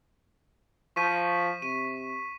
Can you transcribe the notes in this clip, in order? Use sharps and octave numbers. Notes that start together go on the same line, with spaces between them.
F3 C#6 B6 D#7
C3 D#7